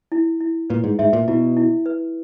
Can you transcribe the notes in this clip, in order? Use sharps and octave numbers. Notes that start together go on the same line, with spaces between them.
E4
E4
A#2 B4
G#2
G#2 E5
A#2
B2 E4
E4
B4